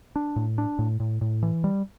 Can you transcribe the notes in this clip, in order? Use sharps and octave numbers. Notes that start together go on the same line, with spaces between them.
D4
A2
D4
A2
A2
A2
E3
G3